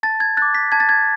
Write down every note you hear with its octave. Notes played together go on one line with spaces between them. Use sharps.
A5 A6
G#6
D6 F#6 A6
B6
A5 G#6
A6
G#6